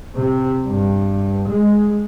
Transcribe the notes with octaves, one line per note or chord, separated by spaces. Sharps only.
C3
G2
G#3